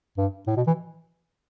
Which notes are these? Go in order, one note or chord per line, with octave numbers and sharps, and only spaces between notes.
G2
A2
B2
E3